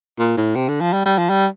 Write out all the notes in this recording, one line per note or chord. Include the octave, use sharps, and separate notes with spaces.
A#2
A2
C3
D3
F3
G3
G3
F3
G3